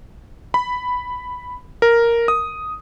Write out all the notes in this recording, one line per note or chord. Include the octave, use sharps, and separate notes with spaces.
B5
A#4
D#6